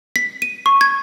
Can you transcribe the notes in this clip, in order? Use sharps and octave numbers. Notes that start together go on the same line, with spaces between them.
B6
D#7
C#6
G#6